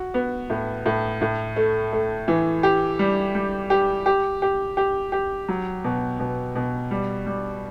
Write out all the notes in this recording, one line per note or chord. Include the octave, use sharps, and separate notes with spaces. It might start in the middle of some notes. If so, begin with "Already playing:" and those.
Already playing: F#4
B3
A2
A2
A2
A3
A3
E3
G4
G3
G3
G4
G4
G4
G4
G4
F#3
B2
B2
B2
G3
G3